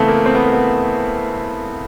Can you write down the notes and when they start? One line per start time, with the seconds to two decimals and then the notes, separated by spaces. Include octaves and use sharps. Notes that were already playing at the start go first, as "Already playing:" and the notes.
Already playing: C#3 E3 A3 B3 C4
0.08 A#3
0.26 C4
0.35 B3
0.44 A#3
0.53 B3